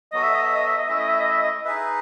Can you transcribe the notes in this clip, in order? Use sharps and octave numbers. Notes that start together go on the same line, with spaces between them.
F#3 B3 F#4 A4 D#5
E5
D#5
E5
D#5
E5
D#5
A3 C#4 E4 E5
D#5
E5
D#5
E5
D#5
D#4 G#4 B4 E5